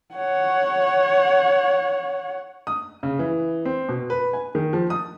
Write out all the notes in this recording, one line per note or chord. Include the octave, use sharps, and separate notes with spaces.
C#5 F#5
D#6
C#3
E3
C4
B2
B4
G#5
D#3
F3
D#6